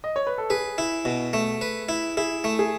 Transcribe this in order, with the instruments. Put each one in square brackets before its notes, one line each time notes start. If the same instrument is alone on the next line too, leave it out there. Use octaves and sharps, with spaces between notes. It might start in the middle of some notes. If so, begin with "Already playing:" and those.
[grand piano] D#5
C#5
B4
A4
[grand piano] G#4 [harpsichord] B4
[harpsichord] E4
B2
A3
B4
E4
[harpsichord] E4 [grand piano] G#4
[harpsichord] A3
[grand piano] G#4